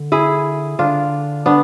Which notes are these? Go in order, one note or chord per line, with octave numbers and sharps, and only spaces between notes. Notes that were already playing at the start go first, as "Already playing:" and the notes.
Already playing: D3
E4 G#4
D3 D4 F4
B3 D4